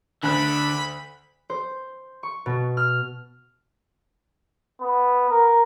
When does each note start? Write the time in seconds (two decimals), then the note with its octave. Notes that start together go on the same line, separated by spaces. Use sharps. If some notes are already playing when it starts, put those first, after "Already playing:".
0.24 D2 D3 B5 F#6
1.50 C5
2.23 C#6
2.46 B2
2.77 F6
4.81 B3
5.30 A#4